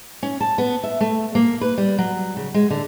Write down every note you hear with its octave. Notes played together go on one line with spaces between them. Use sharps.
C#4
A5
B3
E5
A3
A#3
B4
G3
F#3
C#3
G#3
D3